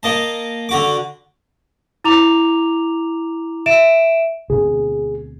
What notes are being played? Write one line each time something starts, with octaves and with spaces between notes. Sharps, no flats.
A#3 D#5 A5
D3 F#4 D6
E4 A#5 D6 F7
E5 D7 E7
D2 B2 C4 G#4